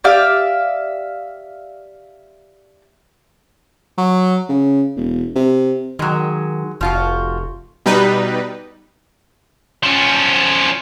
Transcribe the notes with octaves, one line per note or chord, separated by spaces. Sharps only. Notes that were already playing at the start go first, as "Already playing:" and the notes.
G4 D5 E5 F5
F#3
C#3
E1
C3
D#3 F#3 G#3
F1 F3 F4 F#4
B2 G3 D#4 B4
F3 C#4